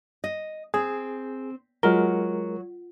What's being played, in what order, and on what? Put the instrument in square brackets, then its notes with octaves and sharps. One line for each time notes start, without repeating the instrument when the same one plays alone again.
[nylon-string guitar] D#5
[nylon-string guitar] C4 [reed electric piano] G#4
[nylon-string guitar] F#3 [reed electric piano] G#3 A#4 [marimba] F4